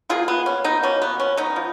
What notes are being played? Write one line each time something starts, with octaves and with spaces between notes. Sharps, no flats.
B2 A#3 F4 G#4
B3
C#4
B3 D#4
B2 A#3 C#4
B3
C#4
B3 D#4
F3